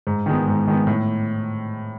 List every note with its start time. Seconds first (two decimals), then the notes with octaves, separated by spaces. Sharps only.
0.07 G#2
0.26 D#3 G#3 B3
0.47 G#2
0.67 D#3 G#3 B3
0.87 A2